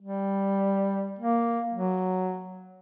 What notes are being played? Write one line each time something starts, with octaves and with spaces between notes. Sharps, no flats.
G3
A#3
F#3